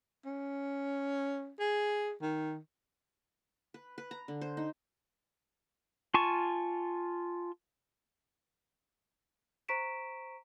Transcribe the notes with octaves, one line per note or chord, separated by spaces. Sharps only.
C#4
G#4
D#3
B4
B4
A#5
D3
C5
D#4
F4 G#5 A5 C#6
C5 A#5 C#6 B6 D7 E7